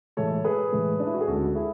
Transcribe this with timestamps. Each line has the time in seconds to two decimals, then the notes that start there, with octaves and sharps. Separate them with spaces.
0.17 A2 E3 G#3 A4 C#5
0.44 G#4 B4
0.72 A2 E3 G#3
1.00 D4
1.06 E4
1.14 F#4
1.21 G#4
1.28 D2 C#3 G#3 F#4 A4
1.55 E4 G#4